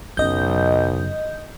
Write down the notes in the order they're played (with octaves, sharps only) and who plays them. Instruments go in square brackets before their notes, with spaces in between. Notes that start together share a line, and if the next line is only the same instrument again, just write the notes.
[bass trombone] B1 [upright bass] F#2 C#3 [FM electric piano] D#5 G6